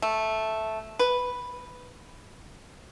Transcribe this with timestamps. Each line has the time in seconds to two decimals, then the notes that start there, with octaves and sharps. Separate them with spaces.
0.02 A3
0.99 B4